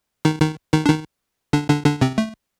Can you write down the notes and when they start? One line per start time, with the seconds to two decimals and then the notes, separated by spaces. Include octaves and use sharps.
0.25 D#3 D#4
0.41 D#3 D#4
0.73 D#3 D#4
0.86 D4
0.89 D#3 D#4
1.53 D3 D4
1.69 D3 D4
1.86 D3 D4
2.01 C3 C4
2.18 A3